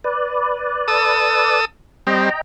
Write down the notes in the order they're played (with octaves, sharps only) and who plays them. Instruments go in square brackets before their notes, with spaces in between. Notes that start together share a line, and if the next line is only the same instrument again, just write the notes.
[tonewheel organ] B4 D5
[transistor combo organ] A4 D#6 E6
[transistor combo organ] G3 C4 [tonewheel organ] D#5 G5 A#5